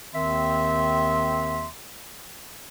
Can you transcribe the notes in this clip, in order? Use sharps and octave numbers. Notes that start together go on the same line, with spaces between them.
D#2 D#3 C4 E5 C6